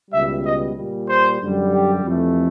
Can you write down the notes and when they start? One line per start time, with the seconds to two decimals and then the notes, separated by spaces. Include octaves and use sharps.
0.11 C#2 B2 G3 E5
0.43 D#5
0.75 A#2 G3
1.07 C5
1.40 F#2 D3 G3
1.72 G4
2.04 F2 C3 E3 A3